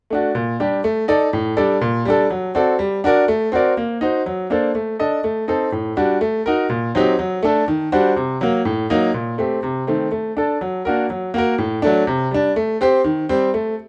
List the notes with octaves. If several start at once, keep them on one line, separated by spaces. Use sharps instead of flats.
A3 D4 F#4
A#2
G3 D4 G4
A3
D#4 A4 D5
A2
G3 D4 A4 D5
A#2
G3 D4 A4
F#3
C4 F#4 A4 D5
G3
D4 F#4 A#4 D5
A3
C4 F#4 A#4 D5
A#3
D#4 F#4 C5
F#3
A#3 D4 A4 C5
A3
D4 A4 D#5
A3
C4 D#4 A4
A2
G3 D4 F#4
A3
D#4 F#4 A#4
A#2
F#3 C4 D#4 G4
F#3
A3 D4 A4
D#3
G3 D4 F#4 C5
C3
F#3 A#3
A2
F#3 A#3 D#4
A#2
A3 C4 G4
C3
D#3 A3 C4
A3
D4 A4
F#3
A#3 D4 F#4 A#4
F#3
A#3 F#4 A#4
A2
F#3 A3 D4
C3
G3 D4
A3
C4 G4 C5
D#3
G3 C4
A3